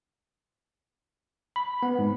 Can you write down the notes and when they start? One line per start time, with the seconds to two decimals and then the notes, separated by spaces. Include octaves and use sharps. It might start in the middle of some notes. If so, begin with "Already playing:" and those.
1.56 B5
1.83 B3
1.99 G#2